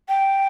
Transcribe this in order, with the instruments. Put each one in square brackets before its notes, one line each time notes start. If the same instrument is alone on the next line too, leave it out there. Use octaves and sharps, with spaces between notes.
[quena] G5